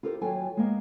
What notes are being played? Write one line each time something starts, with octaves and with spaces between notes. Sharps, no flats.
F4 G4 A4 A#4 C5
D#2 F#3 F4 A4 G5 G#5
G#3 A#3 B3